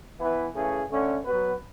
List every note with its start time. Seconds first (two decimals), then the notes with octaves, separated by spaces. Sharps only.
0.19 E3 B3 E4 B4
0.54 C#3 E3 A3 C#4 G#4
0.89 D3 A3 C#4
1.24 F#3 B3 F#4 B4